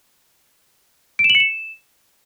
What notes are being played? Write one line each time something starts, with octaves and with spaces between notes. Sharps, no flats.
D7
E7
F#7
C#7
E7